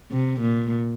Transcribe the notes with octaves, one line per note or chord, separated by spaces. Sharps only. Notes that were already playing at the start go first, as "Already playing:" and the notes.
C3
A#2